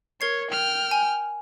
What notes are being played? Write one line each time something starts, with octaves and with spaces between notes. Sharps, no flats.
A#4 C#5 G#6 C7
G5 F6
G#5